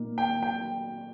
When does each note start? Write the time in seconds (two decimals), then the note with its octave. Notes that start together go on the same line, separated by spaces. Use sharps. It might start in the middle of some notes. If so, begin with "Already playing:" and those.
Already playing: A#2 A#3 D#4
0.18 G5
0.43 G5